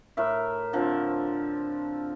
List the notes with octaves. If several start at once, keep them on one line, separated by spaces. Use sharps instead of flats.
A2 A#4 E5
D3 F3 C4